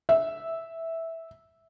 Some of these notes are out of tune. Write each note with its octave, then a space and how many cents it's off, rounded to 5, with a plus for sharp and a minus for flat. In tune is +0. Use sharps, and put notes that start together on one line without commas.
E5 -10